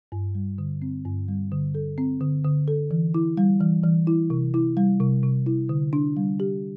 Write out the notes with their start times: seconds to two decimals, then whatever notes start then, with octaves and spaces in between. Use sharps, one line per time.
0.12 G2
0.35 G3
0.58 D3
0.82 C4
1.05 G2
1.28 G3
1.52 D3
1.75 A4
1.98 C4
2.21 D3
2.45 D3
2.68 A4
2.91 E3
3.14 E4
3.37 G3
3.61 E3
3.83 E3
4.07 E4
4.30 C3
4.54 E4
4.77 G3
5.00 C3
5.23 C3
5.46 E4
5.69 D3
5.93 D4
6.17 G3
6.40 G4